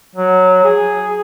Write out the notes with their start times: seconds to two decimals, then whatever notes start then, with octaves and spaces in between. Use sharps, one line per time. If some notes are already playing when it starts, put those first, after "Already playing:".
0.15 F#3
0.64 G#4